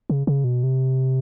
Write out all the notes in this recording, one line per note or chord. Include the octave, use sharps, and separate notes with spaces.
C#3
C#3
B2
C3